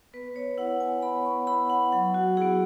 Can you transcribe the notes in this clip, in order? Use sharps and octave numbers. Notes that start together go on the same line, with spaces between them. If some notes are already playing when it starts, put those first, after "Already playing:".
B3 B4
C#5
E4 F#5
G#5
B3 B5
C#6
E4 B5
F#5
F#3 F#5
F#4
B3 E4 G#4